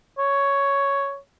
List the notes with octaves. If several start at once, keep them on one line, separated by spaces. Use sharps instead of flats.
C#5